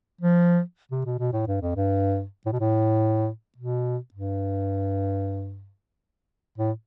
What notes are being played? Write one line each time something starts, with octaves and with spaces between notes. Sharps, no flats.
F3
C3
B2
B2
A2
G2
F2
G2
A2
B2
A2
B2
G2
A2